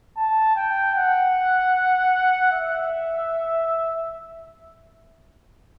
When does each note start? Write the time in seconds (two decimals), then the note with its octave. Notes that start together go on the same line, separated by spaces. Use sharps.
0.16 A5
0.56 G5
0.95 F#5
2.52 E5